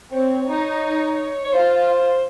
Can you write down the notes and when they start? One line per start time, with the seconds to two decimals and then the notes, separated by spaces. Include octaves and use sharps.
0.11 C4 C#5
0.47 D#4
1.44 C#5
1.52 F4 C5